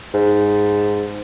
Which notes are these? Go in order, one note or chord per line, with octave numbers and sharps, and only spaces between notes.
G#2